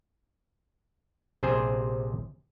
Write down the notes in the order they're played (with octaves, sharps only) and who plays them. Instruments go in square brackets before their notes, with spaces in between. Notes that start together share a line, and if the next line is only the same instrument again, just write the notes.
[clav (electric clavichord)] A#1 C3 G#4 C5 G#5